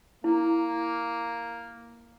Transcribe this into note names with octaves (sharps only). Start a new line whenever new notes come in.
A#3 E4